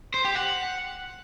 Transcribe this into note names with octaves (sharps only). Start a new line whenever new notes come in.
C5
G4
F#5